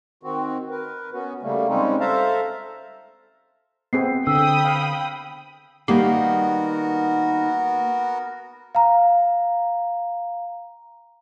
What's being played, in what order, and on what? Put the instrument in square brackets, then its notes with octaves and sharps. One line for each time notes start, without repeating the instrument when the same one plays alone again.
[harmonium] D#3 C4 F#4
A#4 B4
B3 C#4 F#4
C#3 G3 A3 A#3
G3 G#3 C4 C#4 D#4
A4 C5 E5 F5 A5 A#5
[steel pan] B3 C4 G#4 [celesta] C7
[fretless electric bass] D3 [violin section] G5 B5 D#6 [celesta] E6
[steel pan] F5
[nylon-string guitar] D#3 G3 [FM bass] A#3 [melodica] B3 F#4 A#4
[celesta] F5 A#5